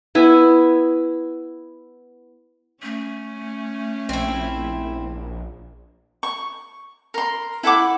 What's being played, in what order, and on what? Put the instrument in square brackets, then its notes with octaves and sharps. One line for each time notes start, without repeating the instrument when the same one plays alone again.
[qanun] B3 E4 G#5
[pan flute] A3 [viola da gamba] C#4
[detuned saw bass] A#1 [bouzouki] C4 E4
[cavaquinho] C#6
A#4 C6
E4 A4 F#5 D6